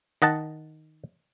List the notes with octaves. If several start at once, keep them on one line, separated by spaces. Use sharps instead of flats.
D#3 D#5 F#5 A5